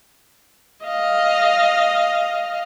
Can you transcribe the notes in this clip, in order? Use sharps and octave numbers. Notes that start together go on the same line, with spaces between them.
D#5 F5